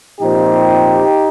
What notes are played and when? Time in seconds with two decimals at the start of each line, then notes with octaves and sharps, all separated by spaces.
0.20 A#2 F3 C4 D#4 G4